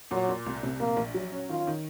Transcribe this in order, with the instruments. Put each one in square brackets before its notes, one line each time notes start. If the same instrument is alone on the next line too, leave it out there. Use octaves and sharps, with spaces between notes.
[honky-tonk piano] A#2 [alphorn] F#3
[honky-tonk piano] A#2
C2
C3
[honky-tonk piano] A#1 [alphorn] A#3
[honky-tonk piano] A#1
F#3
C#4
[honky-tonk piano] D#3 [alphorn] F4
[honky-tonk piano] D#3